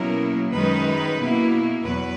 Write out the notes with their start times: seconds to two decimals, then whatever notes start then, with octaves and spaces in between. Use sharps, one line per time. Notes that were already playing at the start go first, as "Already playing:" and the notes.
Already playing: B2 F#3 A#3 C#4 E4 A#4
0.54 F#2 D#3 G#3 D#4 B4
1.19 B2 A#3 E4
1.82 E2 B2 F#3 B4